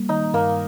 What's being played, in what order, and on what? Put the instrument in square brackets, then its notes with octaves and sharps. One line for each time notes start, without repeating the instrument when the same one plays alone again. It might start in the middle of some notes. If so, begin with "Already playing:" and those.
Already playing: [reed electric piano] G3 A#3
[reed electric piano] D#3 [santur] D#4
[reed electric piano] G2 [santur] A#3